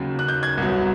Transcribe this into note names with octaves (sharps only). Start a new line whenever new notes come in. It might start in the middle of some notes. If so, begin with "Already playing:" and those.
Already playing: D#2 C#3 F#3
F#6
G6
G#6
C2 B2 F#3